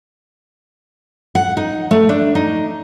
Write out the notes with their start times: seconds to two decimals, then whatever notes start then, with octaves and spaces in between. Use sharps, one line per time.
1.35 F#5
1.57 D#4
1.91 A3
2.09 D4
2.35 D#4